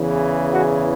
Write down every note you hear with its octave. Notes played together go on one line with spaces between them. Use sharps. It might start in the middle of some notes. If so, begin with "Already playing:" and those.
Already playing: E2 C#3 E3
F#4